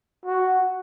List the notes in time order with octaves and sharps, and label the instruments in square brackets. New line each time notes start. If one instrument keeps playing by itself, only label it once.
[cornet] F#4